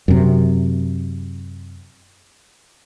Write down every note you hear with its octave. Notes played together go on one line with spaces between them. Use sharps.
F#2 C3